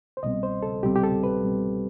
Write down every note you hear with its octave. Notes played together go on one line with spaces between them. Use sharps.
C5
C2 B2 G3 C4 D#5
C5
A4
C2 B2 G3 C4 G4
G4
A4
B4
C2 B2 G3 C4